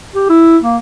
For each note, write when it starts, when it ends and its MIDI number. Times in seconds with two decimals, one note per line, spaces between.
0.15 0.26 67
0.29 0.58 64
0.63 0.77 58